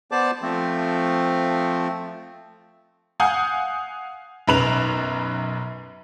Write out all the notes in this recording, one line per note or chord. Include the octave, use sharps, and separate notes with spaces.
B3 C5 D5 A5 D6
F3 A3 C4
F5 F#5 G#5 D#6 G6
B1 F#2 B4 E7 F7